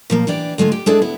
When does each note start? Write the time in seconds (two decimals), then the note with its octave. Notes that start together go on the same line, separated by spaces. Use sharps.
0.10 A#2 F3 A#3
0.27 E3 D4 G4 D5
0.58 D3 G#3 A3 F4
0.72 G4
0.86 G#3 D4 E4 G#4 A4 D5
1.02 D2 B3 E4